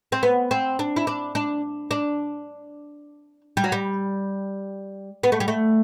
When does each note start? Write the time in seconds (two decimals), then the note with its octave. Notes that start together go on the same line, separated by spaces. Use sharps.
0.12 C4
0.23 B3
0.51 C4
0.79 D4
0.96 E4
1.07 D4
1.35 D4
1.91 D4
3.57 G3
3.64 F#3
3.72 G3
5.23 B3
5.32 A3
5.40 G3
5.48 A3